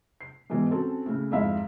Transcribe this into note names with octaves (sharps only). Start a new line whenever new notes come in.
C7
G#2 B2 E3 G#3
C4 C#4 F#4 A4 A5
A2 C#3
F2 G#2 E4 E5 F5